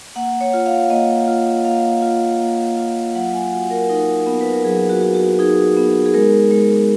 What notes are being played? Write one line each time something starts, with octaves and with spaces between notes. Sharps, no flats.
A#3 F#5
C#5
F4
F5
A#3 D#5
F4
A#3 F5
F4
A#3
F4
F#3 F#5
G#5
F#4 F#5
A#4
D#4 A#4
B3
B4
A#4
F#3 G#4
F#4
F#4
F#4
D#4 G#4
B3
G#4
G#3 A#4
G#3